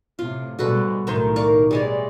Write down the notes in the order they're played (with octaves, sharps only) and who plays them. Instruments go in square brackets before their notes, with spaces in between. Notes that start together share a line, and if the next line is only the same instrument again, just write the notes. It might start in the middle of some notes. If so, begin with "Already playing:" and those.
[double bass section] A2 C3 [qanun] F4
[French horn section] G#2 G#3 [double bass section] B2 G3 [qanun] F#4 A4 B4
[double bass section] B1 A2 [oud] D#3 D#4 C5 [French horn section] A#4
[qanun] D5 F5 C#6
[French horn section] E3 D5 [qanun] G3 G#3 C#5